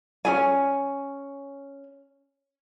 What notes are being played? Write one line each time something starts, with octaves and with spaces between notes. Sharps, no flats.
C#4 G#4 G#5